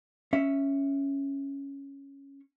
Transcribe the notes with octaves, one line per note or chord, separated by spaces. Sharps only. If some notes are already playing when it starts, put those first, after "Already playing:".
C#4 E5